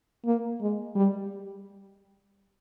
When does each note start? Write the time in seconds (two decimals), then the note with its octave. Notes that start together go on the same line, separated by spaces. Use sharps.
0.25 A#3
0.61 G#3
0.95 G3